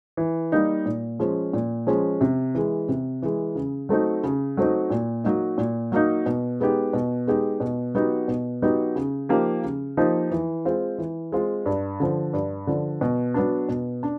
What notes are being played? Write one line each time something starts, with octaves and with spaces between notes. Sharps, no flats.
E3
G3 A#3 D#4
A#2
F3 G#3 C#4
A#2
F3 G#3 C#4
C3
E3 G#3
C3
E3 G#3
C#3
F#3 A3 C4 D#4
C#3
F#3 A3 C4 D#4
A#2
F#3 A#3 D#4
A#2
F#3 A#3 D#4
B2
G#3 B3 D#4 G4
B2
G#3 B3 D#4 G4
B2
F#3 B3 D#4 G4
B2
F#3 B3 D#4 G4
C#3
F3 A#3 D#4 G4
C#3
F3 A#3 D#4 G4
E3
G#3 C4 F4
E3
G#3 C4 F4
G2
D3 F3
G2
D3 F3
B2
F#3 B3 D4
B2
D4